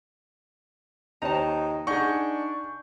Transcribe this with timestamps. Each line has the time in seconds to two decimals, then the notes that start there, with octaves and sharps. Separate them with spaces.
1.22 D#2 D#4 C5 C#5 A5 A#5
1.87 D4 D#4 G#4 F#5 G#5 C#6 G6